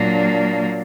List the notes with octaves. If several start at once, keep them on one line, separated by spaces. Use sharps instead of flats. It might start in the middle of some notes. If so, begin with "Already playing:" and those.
Already playing: A#2 F#3 A#3 D4